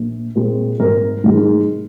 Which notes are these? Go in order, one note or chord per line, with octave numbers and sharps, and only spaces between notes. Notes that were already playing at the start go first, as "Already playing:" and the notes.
Already playing: A#1
A#2 G#3 C4
G#1 A#4
G#2 D#3 G#3